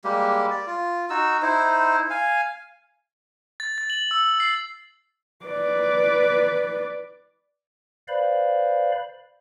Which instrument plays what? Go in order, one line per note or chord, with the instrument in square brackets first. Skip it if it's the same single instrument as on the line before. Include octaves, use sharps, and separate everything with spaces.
[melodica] G3 G#3 A#3 G4
D5
F4
D#4 F#4 E6
D#4 E4 C5
F5 G#5
[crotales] A6
A6
F#7
E6
C7
[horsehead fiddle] B4 D5
[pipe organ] B4 C5 D5 F5 B5